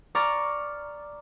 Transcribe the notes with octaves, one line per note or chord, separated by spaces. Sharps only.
D5 A#5 C#6 F6 A6